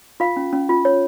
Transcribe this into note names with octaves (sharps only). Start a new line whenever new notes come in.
F4 F5
C#4
C#4
F4
C#5